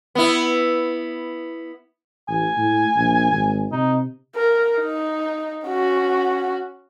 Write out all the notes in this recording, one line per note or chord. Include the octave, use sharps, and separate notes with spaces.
B3 E4
A1 G#5
A2
A#1
G#1
C3 D#4
A#4
D#4
C#4 F#4